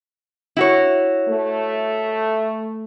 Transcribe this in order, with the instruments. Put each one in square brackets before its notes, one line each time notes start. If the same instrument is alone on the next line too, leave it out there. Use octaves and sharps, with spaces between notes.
[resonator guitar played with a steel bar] E4 F#4 C#5
[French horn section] A3